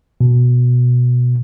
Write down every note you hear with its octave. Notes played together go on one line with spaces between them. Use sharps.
B2